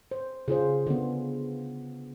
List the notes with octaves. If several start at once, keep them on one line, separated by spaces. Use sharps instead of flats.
C5
C#3 F4 G#4 C5
D3 B3